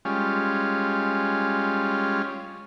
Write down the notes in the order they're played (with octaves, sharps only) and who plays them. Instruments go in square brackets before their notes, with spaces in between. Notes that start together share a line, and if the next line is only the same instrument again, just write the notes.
[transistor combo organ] G3 G#3 C#4 F4